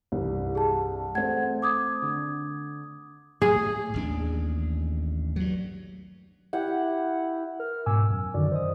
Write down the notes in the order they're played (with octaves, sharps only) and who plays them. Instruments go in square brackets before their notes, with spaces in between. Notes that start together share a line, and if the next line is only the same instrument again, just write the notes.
[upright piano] C2 G2 E3
[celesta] G#4 A5
[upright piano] A3 C4 [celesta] F#5 G#6
[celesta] D6 D#6 G#6
[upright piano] D3
[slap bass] A2 [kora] G#4
[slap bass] A1 D#2 D4
G2 F#3
[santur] E4 G4 F#5
[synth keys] A#4 F6
G#2 B2 G#5 D6 E6
F#2
F#2 D3 D#3 F#4 D5
C5 D#5 D#6